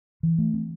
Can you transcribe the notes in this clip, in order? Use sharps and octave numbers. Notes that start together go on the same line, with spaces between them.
E3
A3
C4